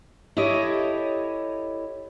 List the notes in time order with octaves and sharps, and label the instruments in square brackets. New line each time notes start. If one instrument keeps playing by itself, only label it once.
[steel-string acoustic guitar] E4 G4 A4 C#5 D#5